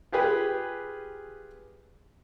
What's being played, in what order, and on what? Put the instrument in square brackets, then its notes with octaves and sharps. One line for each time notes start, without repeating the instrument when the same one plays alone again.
[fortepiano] F4 G4 G#4 B4